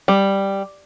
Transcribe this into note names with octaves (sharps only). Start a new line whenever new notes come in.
G3